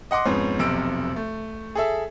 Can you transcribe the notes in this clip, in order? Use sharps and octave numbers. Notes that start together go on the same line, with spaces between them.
D#5 F#5 C6 D6
F2 G#2 B3 C#4
F1 B1 C3 E6 D7
A3
G#4 A4 E5